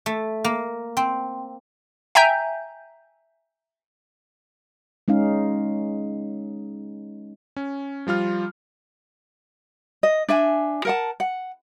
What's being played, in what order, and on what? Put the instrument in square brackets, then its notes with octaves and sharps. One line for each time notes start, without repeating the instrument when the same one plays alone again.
[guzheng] A3
A#3
C4
[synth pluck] E5 G5 G#5 A#5 G6
[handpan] G#3 C#4 D#4 F5
[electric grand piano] C#4
F3 G3 F4 F6
[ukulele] D#5
D4 E5 G#5
A#4 F#5 A5
F#5